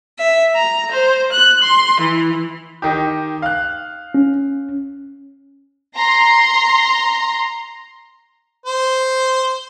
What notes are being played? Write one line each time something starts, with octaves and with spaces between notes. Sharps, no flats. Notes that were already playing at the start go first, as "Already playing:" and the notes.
E5
A#5
C5
F#6
C6
E3
D#3 D#4 G4
F5 F#6
C#4
A#5 C6
C5